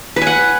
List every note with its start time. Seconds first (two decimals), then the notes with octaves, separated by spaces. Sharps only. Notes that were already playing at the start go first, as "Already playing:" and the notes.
0.16 B4
0.22 G#5
0.27 F#5